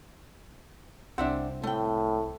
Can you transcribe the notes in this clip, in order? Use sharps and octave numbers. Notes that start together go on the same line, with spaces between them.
C2 C4 D4 E5 F#5
A2 A3 G5